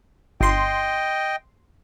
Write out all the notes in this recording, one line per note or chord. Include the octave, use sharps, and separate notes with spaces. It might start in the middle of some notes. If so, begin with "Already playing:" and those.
G1 D#5 G5 C6